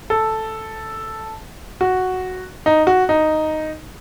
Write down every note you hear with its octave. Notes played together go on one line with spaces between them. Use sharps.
A4
F#4
D#4
F#4
D#4